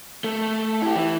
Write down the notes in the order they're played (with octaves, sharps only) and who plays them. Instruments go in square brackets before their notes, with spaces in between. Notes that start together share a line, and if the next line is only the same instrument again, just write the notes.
[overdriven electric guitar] A3
E4 G4
E3